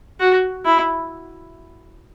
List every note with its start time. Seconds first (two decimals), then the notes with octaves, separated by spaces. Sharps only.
0.20 F#4
0.65 E4